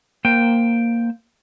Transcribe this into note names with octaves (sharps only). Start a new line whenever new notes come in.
A#3 C5 G5